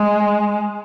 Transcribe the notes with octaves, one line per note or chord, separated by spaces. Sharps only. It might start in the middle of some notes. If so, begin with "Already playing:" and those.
Already playing: G#3